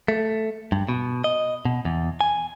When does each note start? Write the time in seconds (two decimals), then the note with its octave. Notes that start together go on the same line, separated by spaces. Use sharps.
0.08 A3
0.72 G2
0.89 B2
1.24 D#5
1.65 B2
1.85 E2
2.21 G#5